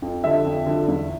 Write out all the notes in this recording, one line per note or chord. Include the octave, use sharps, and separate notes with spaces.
F2
D3 F3 E5
F2
D3 F3
E2